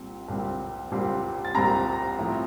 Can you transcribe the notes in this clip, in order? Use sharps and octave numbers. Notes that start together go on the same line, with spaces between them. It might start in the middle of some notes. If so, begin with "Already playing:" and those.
Already playing: C2 A#2 G3 C4
C2 A#2 G3 C4
C2 A#2 G3 C4
A6
C2 A#2 G3 C4 A#5 A#6
A2 F3 C4